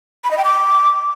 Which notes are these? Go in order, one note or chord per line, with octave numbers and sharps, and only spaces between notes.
B5
D#5
G5
D6